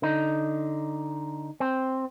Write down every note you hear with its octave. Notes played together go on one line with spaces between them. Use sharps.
D3 D#4
C4